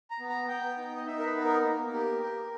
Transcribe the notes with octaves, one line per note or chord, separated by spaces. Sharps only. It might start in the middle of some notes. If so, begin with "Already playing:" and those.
A#5
B3
A#5
B3 G5
D#4
D#5
D#4 E5
A#4
B4
B3
A#4
A#3
G4
G4